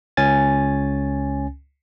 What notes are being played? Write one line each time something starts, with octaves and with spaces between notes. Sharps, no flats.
C#2 C#4 G#5 A6